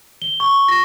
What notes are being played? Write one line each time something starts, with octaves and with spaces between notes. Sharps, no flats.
G7
C#6
A#6